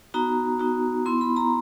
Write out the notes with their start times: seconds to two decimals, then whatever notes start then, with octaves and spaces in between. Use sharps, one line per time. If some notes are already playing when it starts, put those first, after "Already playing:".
0.14 B3 D#4 F#4 A#5
0.59 B3 D#4 F#4
1.06 B3 E4 C6
1.21 B5
1.36 A#5